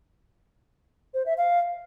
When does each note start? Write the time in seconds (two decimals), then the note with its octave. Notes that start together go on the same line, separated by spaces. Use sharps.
1.14 C5
1.26 E5
1.38 F5